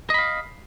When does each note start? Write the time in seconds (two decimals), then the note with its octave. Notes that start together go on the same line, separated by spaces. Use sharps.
0.10 D#5
0.14 B5
0.18 F5